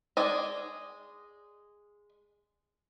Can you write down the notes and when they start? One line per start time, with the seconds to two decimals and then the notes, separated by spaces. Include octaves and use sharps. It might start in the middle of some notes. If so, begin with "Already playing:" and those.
0.17 G#3 D5 D#5